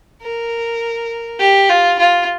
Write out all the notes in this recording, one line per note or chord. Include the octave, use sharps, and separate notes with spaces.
A#4
G4
F4
F4